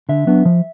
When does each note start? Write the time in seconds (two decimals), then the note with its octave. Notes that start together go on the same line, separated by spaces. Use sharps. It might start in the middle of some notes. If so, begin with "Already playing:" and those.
0.09 D3 E5
0.27 F#3 B3 D4
0.45 F3